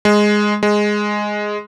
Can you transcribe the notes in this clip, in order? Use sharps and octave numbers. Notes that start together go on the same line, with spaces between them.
G#3
G#3